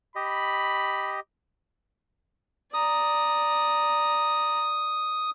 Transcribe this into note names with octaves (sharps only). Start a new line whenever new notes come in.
G4 D#5 B5
D5 A#5 D#6